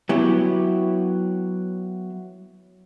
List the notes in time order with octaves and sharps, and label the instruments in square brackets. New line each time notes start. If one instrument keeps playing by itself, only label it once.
[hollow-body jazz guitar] F#3 B3 E4 G4